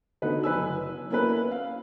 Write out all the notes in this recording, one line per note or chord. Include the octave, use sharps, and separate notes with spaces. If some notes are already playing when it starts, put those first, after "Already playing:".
D3 A3 B3 D#4 F#4 B4
F#1 B4 G#5 E6
A#3 B3 C#4 E4 A#4 B4
F5